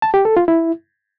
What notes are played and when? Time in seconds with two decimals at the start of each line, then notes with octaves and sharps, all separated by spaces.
0.02 A5
0.14 G4
0.25 A4
0.37 F4
0.48 E4